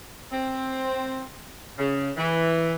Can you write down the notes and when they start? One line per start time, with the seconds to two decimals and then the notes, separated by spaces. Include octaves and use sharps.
0.31 C4
1.78 C#3
2.17 E3